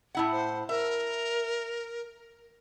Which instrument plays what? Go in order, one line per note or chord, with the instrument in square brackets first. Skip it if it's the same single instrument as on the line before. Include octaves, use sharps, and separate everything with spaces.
[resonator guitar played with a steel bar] A2 E4 F#5
[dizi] C5
[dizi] A#4 [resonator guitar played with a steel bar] E5